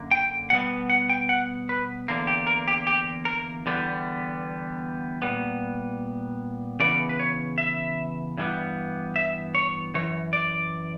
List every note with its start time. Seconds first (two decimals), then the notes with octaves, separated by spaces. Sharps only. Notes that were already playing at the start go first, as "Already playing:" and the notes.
Already playing: F#2 D3 A#3
0.11 G5
0.50 B2 G3 B3 F#5
0.90 F#5
1.09 G5
1.29 F#5
1.69 B4
2.08 E2 D3 A#3
2.27 G4
2.47 A#4
2.68 G4
2.87 G4
3.25 A#4
3.66 E2 D3 G3 B3
5.22 A#2 G3 B3
6.80 C#3 E3 B3 D5
7.09 B4
7.19 C#5
7.58 E5
8.37 G2 E3 G3 B3
9.16 E5
9.55 C#5
9.94 F#2 E3 C#5
10.33 D5